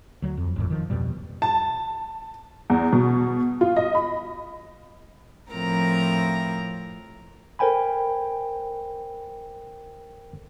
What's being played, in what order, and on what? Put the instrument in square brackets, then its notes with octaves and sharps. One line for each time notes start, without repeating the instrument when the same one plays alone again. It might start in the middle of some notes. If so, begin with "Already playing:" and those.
[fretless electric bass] D2 F#3
F2
G1 F2 A2
D#3 F3
D1 F2 B2 G3
[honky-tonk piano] A5
E2
B2
F4
D#5
B5
[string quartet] A2 F3 C4 A#4 A#5
[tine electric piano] A4 A#4 C5 G5 G#5 B5